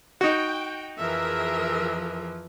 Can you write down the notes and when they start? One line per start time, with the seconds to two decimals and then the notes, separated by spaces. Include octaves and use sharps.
0.21 D#4 F#4 G5
0.99 F2 E3 F3 G#4 A#4 E5